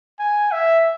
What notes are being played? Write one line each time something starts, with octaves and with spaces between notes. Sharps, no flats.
G#5
E5